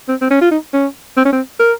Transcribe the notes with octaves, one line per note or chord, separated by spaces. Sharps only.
C4
C4
C#4
F4
D#4
C#4
C4
C#4
C4
A#4